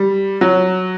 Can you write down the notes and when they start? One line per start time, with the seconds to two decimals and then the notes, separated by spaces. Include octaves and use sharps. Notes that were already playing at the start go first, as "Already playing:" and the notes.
Already playing: G3
0.41 F#3